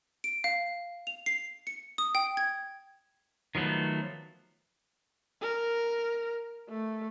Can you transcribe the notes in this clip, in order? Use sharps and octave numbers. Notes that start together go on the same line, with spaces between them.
D7
F5
F7
C7
C#7
D#6
G5
G#6
D#3 F3 F#3 A3 B3
A#4
A3